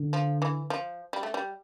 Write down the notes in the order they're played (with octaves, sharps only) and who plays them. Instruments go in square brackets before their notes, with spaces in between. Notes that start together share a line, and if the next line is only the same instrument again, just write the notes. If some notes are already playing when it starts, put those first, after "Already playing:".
Already playing: [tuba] D3
[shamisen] F3
E3
F3
G3
A3
G3